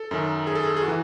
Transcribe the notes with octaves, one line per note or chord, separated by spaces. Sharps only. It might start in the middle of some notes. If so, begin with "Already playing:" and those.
Already playing: A4
F#2 D#3
G#4
A4
G#4
G#4
F#4
E3